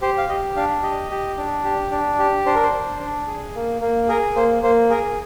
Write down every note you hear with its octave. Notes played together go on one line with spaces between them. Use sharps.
G4 C5
F5
G4 D#5
D4 F5
G4 D#5
G4
D4
G4
D4
G4
D4 C5
A#4
C5
D4
D4
G#4
A#3
A#3
G#4 A#4
A#3 C5
A#3 C5
G#4 A#4